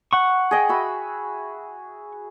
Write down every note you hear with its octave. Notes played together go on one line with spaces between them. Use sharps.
F#5 C#6
G#4 D#5 G5
F#4 E5 B5